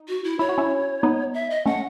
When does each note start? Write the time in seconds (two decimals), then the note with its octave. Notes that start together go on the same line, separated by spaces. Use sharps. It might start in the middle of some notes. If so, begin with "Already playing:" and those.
Already playing: D#4
0.09 F#4
0.24 E4
0.39 E4 C#5
0.49 F#4
0.58 C#4 E4
1.03 B3 D#4
1.34 E5
1.50 D#5
1.66 A3 C#4 F#5